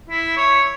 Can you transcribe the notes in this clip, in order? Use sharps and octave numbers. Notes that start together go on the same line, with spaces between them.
E4
C#5